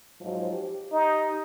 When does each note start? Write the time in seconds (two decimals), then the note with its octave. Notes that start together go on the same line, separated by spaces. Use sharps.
0.21 G#2 F3 F#3
0.52 G4
0.91 D#4